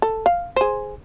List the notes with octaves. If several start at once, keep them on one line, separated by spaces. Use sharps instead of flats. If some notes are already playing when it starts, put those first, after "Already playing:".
A4
F5
G#4 C5